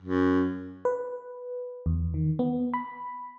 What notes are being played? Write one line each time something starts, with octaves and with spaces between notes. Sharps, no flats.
F#2
B4
E2
D#3
B3
B5